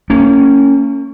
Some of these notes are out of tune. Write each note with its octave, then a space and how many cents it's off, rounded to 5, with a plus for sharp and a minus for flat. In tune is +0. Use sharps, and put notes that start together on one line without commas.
A#3 -35 C#4 +0